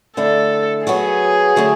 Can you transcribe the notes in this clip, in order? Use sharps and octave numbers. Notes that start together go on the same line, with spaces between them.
D3 A3 E4 A4
F#3 B3 F#4 G#4
D3 F#3 A3